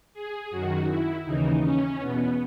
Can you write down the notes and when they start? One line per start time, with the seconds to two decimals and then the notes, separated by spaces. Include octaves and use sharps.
0.14 G#4
0.51 F#2 D#3 F#4
0.88 E4
1.25 D#2 C#3 E3 D#4
1.62 C#4
1.98 E2 B2 B3